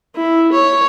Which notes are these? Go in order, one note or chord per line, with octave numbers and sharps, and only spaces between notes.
E4
C#5